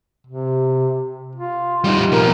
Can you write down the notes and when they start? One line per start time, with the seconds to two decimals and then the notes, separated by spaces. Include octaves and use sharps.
0.27 C3
1.35 F4
1.84 G3 D#4
2.12 B2 F3 A#4